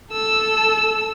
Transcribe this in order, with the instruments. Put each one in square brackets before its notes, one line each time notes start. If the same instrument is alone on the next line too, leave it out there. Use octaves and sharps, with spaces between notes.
[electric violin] A4 E6